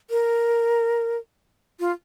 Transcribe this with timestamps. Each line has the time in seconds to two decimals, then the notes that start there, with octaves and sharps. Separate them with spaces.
0.10 A#4
1.80 F4